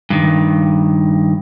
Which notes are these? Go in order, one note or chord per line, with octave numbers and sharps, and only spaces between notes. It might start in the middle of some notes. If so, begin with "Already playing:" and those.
G2 D#3